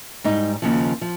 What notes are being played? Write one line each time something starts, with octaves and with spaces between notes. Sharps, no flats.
G#2 G3 D#4
D#2 C#3 F3
F3